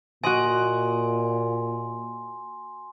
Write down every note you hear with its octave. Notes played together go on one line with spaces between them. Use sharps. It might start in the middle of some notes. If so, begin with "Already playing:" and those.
A#2 F#4 D#5 G#5 C6